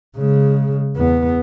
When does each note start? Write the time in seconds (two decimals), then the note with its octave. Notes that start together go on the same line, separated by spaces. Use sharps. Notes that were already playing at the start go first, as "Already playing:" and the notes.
0.17 C#3 G#3
0.96 E2 B3